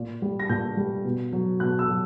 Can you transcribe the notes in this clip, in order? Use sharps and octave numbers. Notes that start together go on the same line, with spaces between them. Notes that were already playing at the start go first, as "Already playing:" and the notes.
Already playing: A#2
G3
A#6
A#2 G6
G3
B2
F#3
B2 F#6
E6
F#3